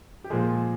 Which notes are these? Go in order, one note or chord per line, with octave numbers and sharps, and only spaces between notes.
G4
A#2 F3 G#3 G#4